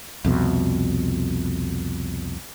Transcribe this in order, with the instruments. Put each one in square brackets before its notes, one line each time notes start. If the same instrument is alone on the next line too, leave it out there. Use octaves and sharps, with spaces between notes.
[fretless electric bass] C2 F2 B2